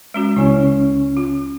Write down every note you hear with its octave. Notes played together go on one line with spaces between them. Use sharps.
G#3 C#4 F#4
C#2 C#4 E4
F4